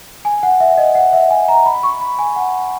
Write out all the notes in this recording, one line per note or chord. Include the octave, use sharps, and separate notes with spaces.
G#5
F#5
E5
D#5
F#5
E5
G#5
A#5
B5
C#6
B5
G#5
F#5